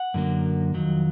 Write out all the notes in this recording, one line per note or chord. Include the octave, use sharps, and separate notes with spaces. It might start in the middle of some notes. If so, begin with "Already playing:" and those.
Already playing: F#5
F#2 D3 F#3 A#3
F2 D#3 F#3